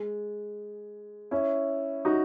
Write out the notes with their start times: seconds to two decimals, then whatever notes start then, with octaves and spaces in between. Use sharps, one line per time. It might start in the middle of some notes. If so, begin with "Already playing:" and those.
Already playing: G#3
1.31 C#4 E4
2.05 D#4 F#4